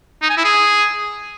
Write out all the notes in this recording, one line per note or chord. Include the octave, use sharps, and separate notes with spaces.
D#4
G#5
E4
G#4